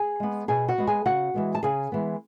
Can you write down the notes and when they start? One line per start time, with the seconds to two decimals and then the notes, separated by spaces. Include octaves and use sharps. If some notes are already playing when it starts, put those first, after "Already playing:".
Already playing: G#4 G#5
0.20 G#3 B3
0.48 B2 G#4 G#5
0.68 F#4 F#5
0.78 G#3 B3
0.87 G#4 G#5
1.05 C#3 F#4 F#5
1.34 E3 G#3 B3
1.55 A5
1.63 C#3 G#4 G#5
1.92 E3 G#3 B3